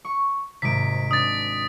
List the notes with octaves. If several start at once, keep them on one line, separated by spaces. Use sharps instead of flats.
C#6
G#1 C3 B6 D7
D4 D#6 A6